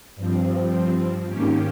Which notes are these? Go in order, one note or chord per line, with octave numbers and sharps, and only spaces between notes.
G2 F3 C4
G#2 D#3 A#3 C#4 G4